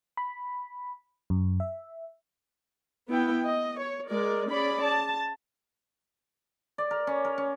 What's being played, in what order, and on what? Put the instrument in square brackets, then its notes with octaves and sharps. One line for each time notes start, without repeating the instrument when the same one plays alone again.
[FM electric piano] B5
F#2
E5
[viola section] B3 E4 G5
D#5
C#5
G#3 A#4 D5
C#4 G#4 D5 B5
A5
[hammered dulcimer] D5
A#4
C#4
A#4
C#4